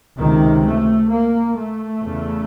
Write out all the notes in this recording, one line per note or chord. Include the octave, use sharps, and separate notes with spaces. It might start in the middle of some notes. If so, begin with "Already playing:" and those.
C#2 C3 D#3
A3
A#3
A3
E2 C#3